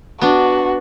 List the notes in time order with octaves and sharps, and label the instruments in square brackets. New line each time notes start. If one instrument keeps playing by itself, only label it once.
[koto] B3 D4 [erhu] F#4